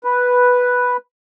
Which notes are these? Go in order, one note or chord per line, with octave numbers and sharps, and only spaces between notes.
B4